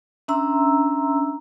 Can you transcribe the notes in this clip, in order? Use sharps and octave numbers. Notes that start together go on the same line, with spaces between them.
C#4 D4 E5 A#5 C6 E6